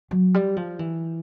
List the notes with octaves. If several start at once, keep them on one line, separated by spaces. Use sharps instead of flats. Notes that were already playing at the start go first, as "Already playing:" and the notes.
F#3
G3
F3
E3